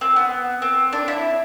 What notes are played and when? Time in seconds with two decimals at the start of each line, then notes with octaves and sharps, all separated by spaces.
0.01 C4
0.16 B3
0.62 C4
0.93 D4
1.08 E4